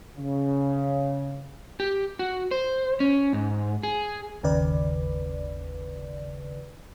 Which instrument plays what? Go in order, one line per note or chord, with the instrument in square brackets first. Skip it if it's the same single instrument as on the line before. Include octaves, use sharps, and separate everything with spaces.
[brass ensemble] C#3
[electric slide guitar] G4
F#4
C5
C#4
G#2
G#4
[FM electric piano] G1 D#2 C#3 B4 D5